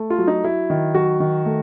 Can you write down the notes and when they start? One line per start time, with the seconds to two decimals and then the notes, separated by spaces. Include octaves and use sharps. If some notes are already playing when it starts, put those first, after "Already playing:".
Already playing: A3
0.10 F4
0.18 F#3
0.28 D#4
0.44 F#3 E4
0.70 D#3
0.94 F#3 F#4
1.20 D#3
1.46 A3